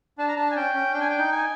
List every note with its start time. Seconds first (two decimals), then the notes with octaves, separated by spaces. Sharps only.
0.18 D4 A5
0.28 A#5
0.36 D4 A5
0.51 G#5
0.56 C#4 G5
0.75 C#4
0.93 D4 G5
1.01 G#5
1.10 G5
1.18 D#4
1.32 G#5